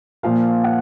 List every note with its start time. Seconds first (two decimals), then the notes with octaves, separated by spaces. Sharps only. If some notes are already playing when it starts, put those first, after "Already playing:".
0.23 A#2 F3 A#3 F5
0.64 F#5